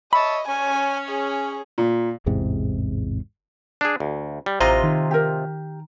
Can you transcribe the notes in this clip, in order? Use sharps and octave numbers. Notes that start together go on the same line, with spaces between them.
C#5 D#5 E5 A5 B5
C#4 G#5
G#4
A#2
A1 E2 G#2 C3
D4 G#4
D2
G3
A1 C3 F4 C5 D#5 A#5
D#3
G4 A#4